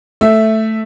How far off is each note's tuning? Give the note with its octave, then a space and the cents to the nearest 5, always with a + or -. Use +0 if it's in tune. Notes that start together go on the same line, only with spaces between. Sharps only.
A3 +0 E5 +0